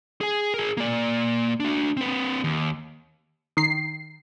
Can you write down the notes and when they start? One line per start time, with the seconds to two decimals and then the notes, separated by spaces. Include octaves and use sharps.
0.21 G#4 G#5
0.54 G#4 A#4
0.77 A#3 D5
1.60 D4 F#4
1.97 C4 B4
2.44 D#2
3.57 D#3 C7